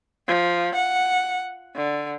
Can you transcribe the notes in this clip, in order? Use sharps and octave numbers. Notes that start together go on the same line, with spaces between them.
F3
F#5
D3